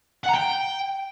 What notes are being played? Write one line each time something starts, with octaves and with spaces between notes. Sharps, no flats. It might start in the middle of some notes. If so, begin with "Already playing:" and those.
F#5
A#5
G5